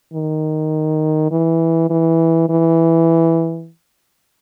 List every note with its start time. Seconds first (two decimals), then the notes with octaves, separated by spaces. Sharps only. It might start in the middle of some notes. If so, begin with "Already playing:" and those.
0.14 D#3
1.31 E3
1.89 E3
2.49 E3